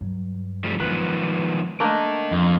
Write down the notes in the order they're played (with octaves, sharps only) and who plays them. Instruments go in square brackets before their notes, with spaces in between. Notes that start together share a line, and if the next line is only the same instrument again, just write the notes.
[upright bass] G2 F#3
[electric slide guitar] F3 G3 A3
[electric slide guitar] D#3 F3 B3 [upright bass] F#3 G#3 [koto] B4
[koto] A3 A#3 D4 [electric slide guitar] A#4 D#5
[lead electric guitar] F2